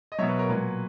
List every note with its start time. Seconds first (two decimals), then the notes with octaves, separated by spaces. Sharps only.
0.12 D#5
0.18 B2 F#3 C#5 E5
0.29 B4
0.39 A#4 C#5
0.49 A#2 F#3 B4